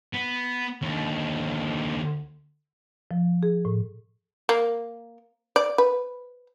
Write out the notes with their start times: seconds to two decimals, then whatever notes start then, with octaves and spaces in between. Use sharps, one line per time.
0.13 B3
0.82 D#2 D3
3.11 F3
3.43 G#4
3.65 A2
4.49 A#3
5.56 D5
5.78 B4